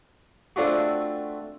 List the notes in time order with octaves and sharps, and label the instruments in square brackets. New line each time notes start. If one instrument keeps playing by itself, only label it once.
[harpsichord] A3 C4 D4 F4 F#4